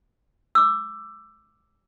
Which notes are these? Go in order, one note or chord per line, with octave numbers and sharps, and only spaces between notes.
D6 E6